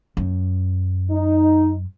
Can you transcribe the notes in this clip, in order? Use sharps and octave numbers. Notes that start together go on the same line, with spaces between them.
F#2
D#4